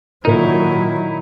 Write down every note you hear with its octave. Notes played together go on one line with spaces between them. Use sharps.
A#2 D#3 F#3 D#4 E4 A#4